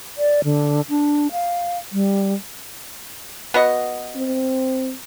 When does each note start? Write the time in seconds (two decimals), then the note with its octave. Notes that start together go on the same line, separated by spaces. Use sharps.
0.18 D5
0.44 D3
0.89 D4
1.32 F5
1.92 G3
3.54 B3 F#4 D#5
4.16 C4